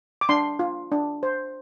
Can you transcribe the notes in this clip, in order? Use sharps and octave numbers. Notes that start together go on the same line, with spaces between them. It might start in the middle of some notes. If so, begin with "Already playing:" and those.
D6
D4 C6
F4
D4
C5